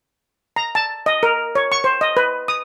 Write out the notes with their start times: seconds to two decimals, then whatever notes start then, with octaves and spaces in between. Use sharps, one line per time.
0.56 A#5
0.75 A5
1.06 D#5
1.23 A#4
1.55 C#5
1.72 C#6
1.84 C5
2.01 D#5
2.17 B4
2.48 D#6